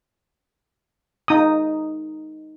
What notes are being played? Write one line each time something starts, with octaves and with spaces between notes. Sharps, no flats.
D#4 D#6